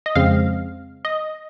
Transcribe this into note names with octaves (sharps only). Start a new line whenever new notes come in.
D#5
F2 C#3 G#3 C4 F5
D#5